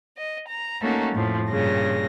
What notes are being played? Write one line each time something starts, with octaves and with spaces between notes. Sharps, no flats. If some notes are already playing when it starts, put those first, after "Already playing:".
D#5
A#5
A3 A#3 C#4 D#4 F#4 A4
F2 A2 F3
G2 A#2 C#3 A#6